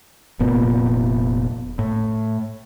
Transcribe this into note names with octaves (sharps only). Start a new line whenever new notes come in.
F1 A#2 B3
A2